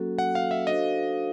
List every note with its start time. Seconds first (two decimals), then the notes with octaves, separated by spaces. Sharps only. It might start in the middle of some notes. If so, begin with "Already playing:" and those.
Already playing: F#3 A#3 C#4 F#4 A4
0.19 F#5
0.35 F5
0.51 E5
0.67 D4 F#4 A4 C5 D#5 F5